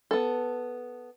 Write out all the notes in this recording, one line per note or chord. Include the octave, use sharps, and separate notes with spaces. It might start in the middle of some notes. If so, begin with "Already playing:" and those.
B3 A4